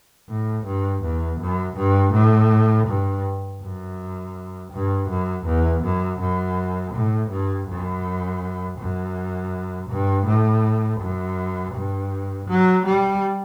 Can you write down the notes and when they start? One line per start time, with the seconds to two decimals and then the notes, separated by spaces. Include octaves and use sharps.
0.29 A2
0.66 G2
1.03 E2
1.40 F#2
1.77 G2
2.13 A2
2.87 G2
3.62 F#2
4.72 G2
5.09 F#2
5.46 E2
5.84 F#2
6.20 F#2
6.94 A2
7.31 G2
7.67 F#2
8.79 F#2
9.90 G2
10.26 A2
11.01 F#2
11.75 G2
12.48 F#3
12.86 G3